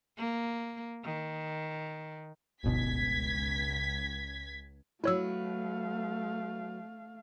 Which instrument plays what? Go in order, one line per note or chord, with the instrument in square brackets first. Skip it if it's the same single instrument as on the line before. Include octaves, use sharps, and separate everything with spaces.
[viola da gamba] A#3
D#3
[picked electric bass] D1 G1 B2 [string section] C#2 G#6 B6
[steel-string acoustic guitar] F#3 B4 [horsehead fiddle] A3 F5 [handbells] E4 C#5 E6